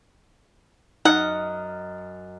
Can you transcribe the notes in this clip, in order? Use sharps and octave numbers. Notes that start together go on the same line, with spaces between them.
F#2 D#4 D#5 F#5 F6